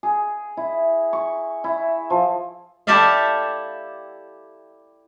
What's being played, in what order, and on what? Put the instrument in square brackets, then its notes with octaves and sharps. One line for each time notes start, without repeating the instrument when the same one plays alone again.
[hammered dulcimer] G#4
E4
C#6
E4
F3
[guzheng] E4 G4 A4 D5 E5 F5